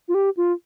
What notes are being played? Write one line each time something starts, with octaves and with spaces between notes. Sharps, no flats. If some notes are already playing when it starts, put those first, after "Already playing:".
F4
G4
F4